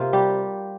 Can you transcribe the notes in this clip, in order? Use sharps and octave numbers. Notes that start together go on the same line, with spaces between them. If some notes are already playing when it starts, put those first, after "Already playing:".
Already playing: C3 A#3 F4
G3 G4